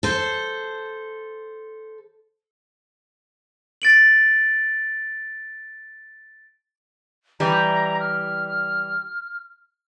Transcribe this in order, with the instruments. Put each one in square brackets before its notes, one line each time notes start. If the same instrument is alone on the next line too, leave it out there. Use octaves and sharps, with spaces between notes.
[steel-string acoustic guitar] A4 C5
[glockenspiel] A6 D7 F#7
[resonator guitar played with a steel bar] E3 G3 [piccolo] A#5
[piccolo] F6